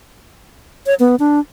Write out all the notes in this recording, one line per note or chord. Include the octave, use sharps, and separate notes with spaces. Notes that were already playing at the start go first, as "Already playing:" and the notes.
C#5
B3
D4